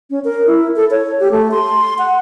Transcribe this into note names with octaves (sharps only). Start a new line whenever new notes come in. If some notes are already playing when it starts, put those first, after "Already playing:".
C#4
A#4
E4
A4
C#5
G4
A3
C6
F#5